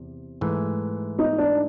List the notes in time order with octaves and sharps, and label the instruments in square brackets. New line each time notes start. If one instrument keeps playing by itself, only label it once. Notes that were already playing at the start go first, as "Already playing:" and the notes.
Already playing: [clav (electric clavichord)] E2 C3
G#2 E3 A3
[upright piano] D#4
D4